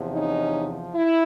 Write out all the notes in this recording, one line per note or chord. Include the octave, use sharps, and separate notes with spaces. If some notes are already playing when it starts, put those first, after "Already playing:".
Already playing: E2 C3 F3
C#4 D#4
E4